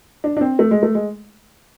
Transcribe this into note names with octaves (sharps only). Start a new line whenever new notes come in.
D4
D4
C4
A3
G#3
A3
G#3